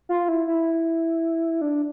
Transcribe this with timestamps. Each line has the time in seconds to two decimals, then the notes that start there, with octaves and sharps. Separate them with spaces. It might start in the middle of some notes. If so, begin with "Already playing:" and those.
0.09 F4
0.28 E4
0.47 E4
1.61 D4